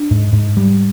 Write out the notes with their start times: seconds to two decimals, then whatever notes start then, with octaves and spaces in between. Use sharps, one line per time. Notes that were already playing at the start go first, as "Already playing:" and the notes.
Already playing: D4
0.11 G#2
0.33 G#2
0.57 G3